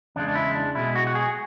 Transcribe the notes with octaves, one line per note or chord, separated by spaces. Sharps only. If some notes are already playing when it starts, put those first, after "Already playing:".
E2 C#3 G#3 D4
D4
E4
D4
B1 B2 G#3 E4
F#4
F#4
G#4